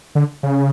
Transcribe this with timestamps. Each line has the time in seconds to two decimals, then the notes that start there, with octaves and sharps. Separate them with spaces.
0.15 D3
0.43 C#3